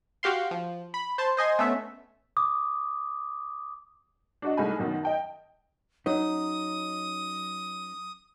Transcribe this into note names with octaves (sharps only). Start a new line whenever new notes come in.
F#4 G4 F5 C6
F3
B5
C5 A5 C6
C5 D#5 G#5 C6
A3 B3 C#4 E5
D6 D#6
D4 F#4 D#5
C2 G#3 A3 D#4 G#5 B5
F#2 B2 D#3
D#5 G5 A5
F#3 C#4 D#4 D#6